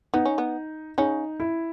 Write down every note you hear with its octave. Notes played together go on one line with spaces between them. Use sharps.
B3 D#4
C#4
B3
C#3 C#4 D#4
E4